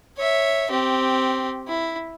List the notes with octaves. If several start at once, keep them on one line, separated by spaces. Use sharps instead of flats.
C#5 E5
C4 G4
E4